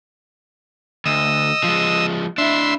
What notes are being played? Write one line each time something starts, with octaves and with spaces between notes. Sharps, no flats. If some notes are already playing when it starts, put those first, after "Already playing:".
D2 D#5 E6
F3 G#3
D4 E4 E5 C6